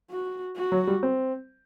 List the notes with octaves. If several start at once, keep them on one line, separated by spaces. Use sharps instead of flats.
F#4
F#4
F#3
G3
C4